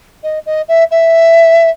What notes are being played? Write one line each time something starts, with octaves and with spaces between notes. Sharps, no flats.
D#5
D#5
E5
E5